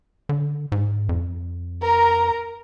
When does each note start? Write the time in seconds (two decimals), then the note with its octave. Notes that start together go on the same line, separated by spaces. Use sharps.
0.29 D3
0.72 G#2
1.09 F2
1.82 A#4 A#5